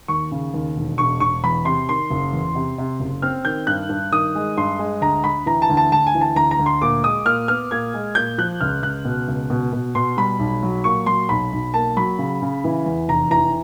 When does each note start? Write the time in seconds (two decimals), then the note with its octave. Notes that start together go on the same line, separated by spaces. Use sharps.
0.08 D#2 C#6
0.31 C#3
0.54 D#2
0.76 E1
0.98 E1 C#6
1.20 E1 C#6
1.44 E2 B5
1.65 C3 C6
1.89 D#3 C6
2.10 F#1
2.33 E2
2.55 C3
2.78 C3
3.00 F#1
3.22 C4 F6
3.45 D#3 G6
3.67 G2 F#6
3.89 G2
4.12 D#3 D#6
4.35 G#3
4.57 G2 C6
4.79 G#3
5.01 D2 A#5
5.24 D2 B5
5.46 E3 A#5
5.62 A5
5.69 D2
5.77 A5
5.92 D2 A5
6.07 G#5
6.15 E3
6.21 A5
6.36 D2 A#5
6.51 A#5
6.59 D2
6.66 C6
6.81 A#2 D6
7.03 G#3 D#6
7.25 A#2 F6
7.48 B3 F6
7.71 A#2 G#6
7.94 G#3
8.15 A#2 G6
8.38 F3 F#6
8.61 C#2 F6
8.82 C#2 F#6
9.05 B2
9.28 C#2
9.50 B2
9.73 B2
9.95 B2 C6
10.17 G3 B5
10.39 B1
10.63 F#3
10.84 A#2 C#6
11.06 F#3 C6
11.29 B1 B5
11.52 B1
11.74 A#3 A5
11.96 F#3 B5
12.18 C#3
12.42 C#3
12.64 E3
12.86 E2
13.09 F1 A#5
13.31 E3 A#5